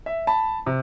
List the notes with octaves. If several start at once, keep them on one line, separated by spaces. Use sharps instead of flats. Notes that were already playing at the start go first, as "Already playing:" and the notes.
E5
A5 B5
C3